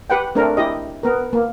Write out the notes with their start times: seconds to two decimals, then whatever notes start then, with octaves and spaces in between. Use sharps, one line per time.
0.10 G4 B4 F#5 G5
0.35 A3 C4 D4 A#4
0.57 E4 G4 D#5
1.03 B3 A#4
1.33 A#3